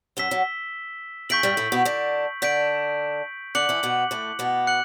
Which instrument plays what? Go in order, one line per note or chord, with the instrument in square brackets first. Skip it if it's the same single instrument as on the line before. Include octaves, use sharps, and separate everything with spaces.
[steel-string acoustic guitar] F#2 F#3 [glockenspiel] E6 B6 E7 G7
[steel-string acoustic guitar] F#2 F#3
[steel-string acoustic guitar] E2 E3 [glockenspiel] C#6 G6 B6 D7 F#7
[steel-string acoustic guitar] G2 G3
A2 A3
B2 B3
D3 D4
[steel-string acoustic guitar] D3 D4 [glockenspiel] G6 B6 D7 F#7
[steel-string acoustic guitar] D3 D4 [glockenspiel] D6 F#6 C#7 F#7
[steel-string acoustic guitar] E3 E4
B2 B3
A2 A3
B2 B3
[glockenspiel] F#6 C#7 F#7